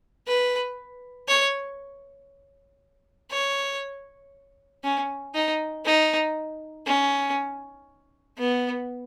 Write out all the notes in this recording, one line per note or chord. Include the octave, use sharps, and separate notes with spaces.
B4
C#5
C#5
C#4
D#4
D#4
C#4
B3